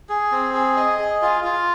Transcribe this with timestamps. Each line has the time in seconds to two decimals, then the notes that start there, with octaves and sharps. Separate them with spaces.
0.09 G#4
0.32 C4
0.54 G#4
0.77 D#5
0.99 G#4
1.22 F4
1.44 F4